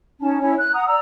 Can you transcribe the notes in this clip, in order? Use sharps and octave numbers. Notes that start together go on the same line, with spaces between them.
C#4 D#4 A5
C#4 E4 C#5
F#6
F#5 A#5 D#6
D5 A#5 E6